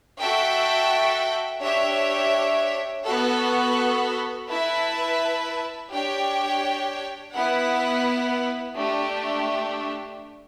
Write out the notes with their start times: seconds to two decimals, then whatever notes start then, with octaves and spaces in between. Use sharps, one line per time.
0.19 F#4 A4 E5 G5
1.62 D4 G4 C#5 E5
3.05 B3 F#4 A4
4.47 E4 B4 E5 A5
5.91 D4 G4 C#5 G5
7.33 B3 E4 B4 F#5
8.76 A3 D4 G4